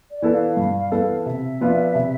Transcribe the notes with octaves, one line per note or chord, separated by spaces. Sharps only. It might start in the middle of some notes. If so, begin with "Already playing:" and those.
D5
E3 B3 E4 A4
F5
G2
E3 B3 E4 A4
C3 E5
F3 B3 D4 F4
C3